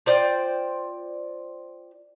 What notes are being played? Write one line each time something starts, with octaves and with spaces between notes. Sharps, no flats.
F4 C5 D5 G5